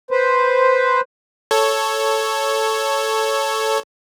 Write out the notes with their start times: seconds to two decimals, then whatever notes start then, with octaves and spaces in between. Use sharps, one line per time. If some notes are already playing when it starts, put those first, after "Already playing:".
0.11 B4 C5
1.51 A4 C#5